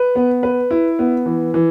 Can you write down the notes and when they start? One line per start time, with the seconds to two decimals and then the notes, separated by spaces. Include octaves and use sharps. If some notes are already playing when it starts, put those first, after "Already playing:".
Already playing: B4
0.15 B3
0.43 B4
0.71 E4
0.99 B3
1.26 E3
1.54 E3